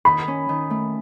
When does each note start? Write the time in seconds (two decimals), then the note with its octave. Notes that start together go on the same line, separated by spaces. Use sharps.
0.05 D#3 B5
0.28 C#4
0.49 D#3
0.70 A3